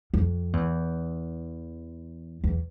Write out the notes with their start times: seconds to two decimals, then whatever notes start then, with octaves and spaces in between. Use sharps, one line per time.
0.14 F2
0.53 E2
2.44 E2